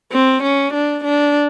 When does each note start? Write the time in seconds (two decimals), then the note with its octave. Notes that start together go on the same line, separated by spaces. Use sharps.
0.12 C4
0.43 C#4
0.74 D4
1.04 D4